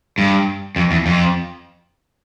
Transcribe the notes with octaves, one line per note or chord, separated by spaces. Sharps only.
G2
F2
E2
F2